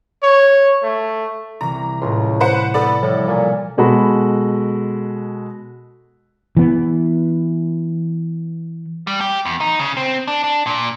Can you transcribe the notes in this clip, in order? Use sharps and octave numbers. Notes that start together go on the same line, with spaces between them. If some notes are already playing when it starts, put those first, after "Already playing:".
C#5
A3
C2 E3 A#5
C#2 A2 C6
B4 C5 F#5
B3 A4 D5
A2 F3 G3
B1 A#2 G#5
B2 G#3 F#4 A4 B5
E3 B3
G3
G4
E2
D#4
C#3
C4
D4
D4
A#2